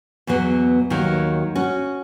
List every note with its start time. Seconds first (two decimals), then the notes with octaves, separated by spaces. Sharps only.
0.27 E2 B2 F#3 B3
0.90 D#2 D#3 F#3
1.55 C#4 F#4